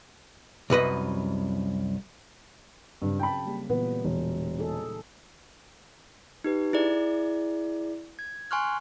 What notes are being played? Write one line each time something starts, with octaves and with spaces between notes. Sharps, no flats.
C2 F#2 B4 D#5
G2 C#3 F#3 C4
G5 A5 B5
G3 A#3 G4
A#2 E3 B3
E1
D#4 G#4 A4
D#4 G4 B4
E4 G#4 D5
G#6
G#5 C6 C#6 F6 F#6